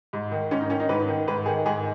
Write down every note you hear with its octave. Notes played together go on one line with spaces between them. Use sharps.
G#2
D#3
G#2 C#4
D#4
D#3 C#4
D#4
G#2 B4
D#3
G#2 B4
D#3 G#4
G#2 G#4